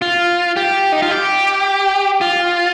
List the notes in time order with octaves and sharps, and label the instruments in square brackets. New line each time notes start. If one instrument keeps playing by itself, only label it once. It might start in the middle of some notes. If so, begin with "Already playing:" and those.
[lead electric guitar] F4
G4
D#4
F4
G4
F4